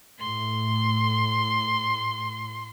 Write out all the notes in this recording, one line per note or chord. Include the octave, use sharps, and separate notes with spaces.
A2 C6